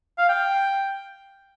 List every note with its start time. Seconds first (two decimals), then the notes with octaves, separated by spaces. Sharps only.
0.18 F5
0.29 G5